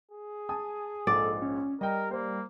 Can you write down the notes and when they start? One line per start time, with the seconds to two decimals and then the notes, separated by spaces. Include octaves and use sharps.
0.11 G#4
0.49 G#5 A5 D#6
1.07 A#1 G#2 G#3 A4 D5
1.42 C#4
1.81 G3 A#4 D#5 G5
2.11 A#3 C5